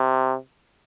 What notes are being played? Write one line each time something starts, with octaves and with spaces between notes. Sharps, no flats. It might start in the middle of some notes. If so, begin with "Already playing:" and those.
Already playing: C3